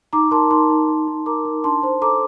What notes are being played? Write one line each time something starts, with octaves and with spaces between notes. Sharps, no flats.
D#4 A#5 D6
A#4 A5 C6
D#4 A5 C6
D#4
D#4
D#4
A#4 A#5 D6
D#4
D4 A5 C6
C5
A4 A#5 D6